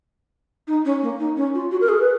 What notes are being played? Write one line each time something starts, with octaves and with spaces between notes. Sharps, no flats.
D#4
C#4
A#3
D#4
C#4
F4
F#4
A#4
G#4
B4